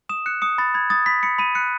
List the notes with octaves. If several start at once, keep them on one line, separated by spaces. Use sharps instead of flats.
D#6 E7
F#6 C#7
D#6 C#7
B5 A6
B5 G#6
D#6 A6
B5 B6
B5 C#7
B5 D#7
F#6 C#7